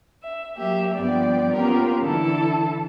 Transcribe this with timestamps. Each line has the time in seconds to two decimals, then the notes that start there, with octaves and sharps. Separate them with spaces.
0.21 E5
0.55 F#3 A#3 G4 E5
0.93 G2 F3 B3 D5 G5
1.52 A#3 B3 C#4 F4 G4 A#4
2.00 D3 E3 E4 A4